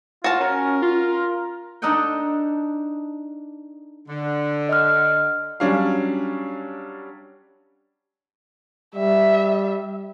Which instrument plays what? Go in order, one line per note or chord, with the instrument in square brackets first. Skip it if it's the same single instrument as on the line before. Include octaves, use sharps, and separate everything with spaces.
[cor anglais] F4 [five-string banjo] F#4 A5
[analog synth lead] C#4 [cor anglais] A#4
[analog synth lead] F4
[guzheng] D4 D#4 A4 D#5 F#5 G5
[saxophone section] D3
[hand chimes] D#5 F6
[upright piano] F#3 G3 C#4 D4 C#5 F5
[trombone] G3 [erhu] E5